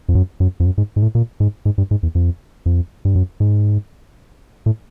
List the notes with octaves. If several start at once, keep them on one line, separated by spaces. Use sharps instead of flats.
F2
F#2
F#2
F2
F#2
G#2
G#2
A2
A#2
G#2
G#2
G2
G#2
E2
F2
F2
G2
F#2
G#2
A2